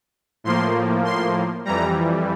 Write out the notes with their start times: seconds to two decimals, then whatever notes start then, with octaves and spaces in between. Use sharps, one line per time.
0.44 A2 F3 A#3 C6
1.05 C6
1.65 F2 E3 G3 A#5